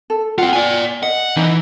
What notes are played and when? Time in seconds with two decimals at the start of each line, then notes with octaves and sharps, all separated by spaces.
0.10 A4
0.38 C4 F4 F#5 G5
0.53 D5 G#5
1.03 D#5 F#5
1.36 E3 D#4 D#5